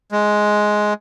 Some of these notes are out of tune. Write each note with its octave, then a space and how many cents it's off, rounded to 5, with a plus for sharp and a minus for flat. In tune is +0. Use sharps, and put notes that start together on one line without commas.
G#3 +10